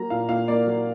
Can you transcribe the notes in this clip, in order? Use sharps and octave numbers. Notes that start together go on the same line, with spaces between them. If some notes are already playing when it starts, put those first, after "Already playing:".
Already playing: F#3 A#3 A#5
A#2 F5
A#2 F5
A#3 D5
F#3